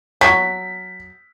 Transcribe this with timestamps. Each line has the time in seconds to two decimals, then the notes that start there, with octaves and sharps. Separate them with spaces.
0.21 F#3 B6